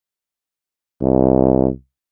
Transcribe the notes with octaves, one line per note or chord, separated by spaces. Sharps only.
C2